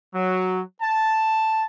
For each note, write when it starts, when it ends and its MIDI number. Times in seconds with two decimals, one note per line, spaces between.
0.14 0.60 54
0.82 1.64 81